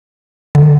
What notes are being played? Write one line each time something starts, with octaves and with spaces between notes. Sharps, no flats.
D3